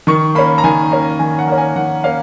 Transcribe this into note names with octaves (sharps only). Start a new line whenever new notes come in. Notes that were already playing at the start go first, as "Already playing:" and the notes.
D#3 C#6
A#3 C#4 B5
A#5
D#3 G#5
A#3 C#4
D#3 G#5
F#5
A#3 C#4
G#5
D#3 F#5
A#3 C#4 F5